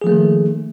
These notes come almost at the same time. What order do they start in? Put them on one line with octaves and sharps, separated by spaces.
G#4 F3 A3 A#3 D#3